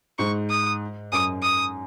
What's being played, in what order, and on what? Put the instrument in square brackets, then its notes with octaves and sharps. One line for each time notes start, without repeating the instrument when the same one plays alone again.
[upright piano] G#2 [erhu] C#6
[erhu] D#6
[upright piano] F#2 [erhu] D#6
[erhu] D#6